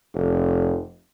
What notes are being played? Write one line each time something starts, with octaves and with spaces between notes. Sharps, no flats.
F1